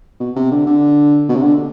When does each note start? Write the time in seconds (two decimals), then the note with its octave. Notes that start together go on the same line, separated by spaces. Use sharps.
0.20 B2
0.36 C3
0.51 D3
0.67 D3
1.29 B2
1.36 C3
1.43 D3